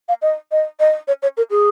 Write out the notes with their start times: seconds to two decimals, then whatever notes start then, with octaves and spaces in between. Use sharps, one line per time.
0.09 F5
0.22 D#5
0.52 D#5
0.80 D#5
1.08 C#5
1.23 C#5
1.37 A#4
1.51 G#4